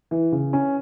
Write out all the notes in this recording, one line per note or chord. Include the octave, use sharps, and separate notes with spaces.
E3
C#3
C#4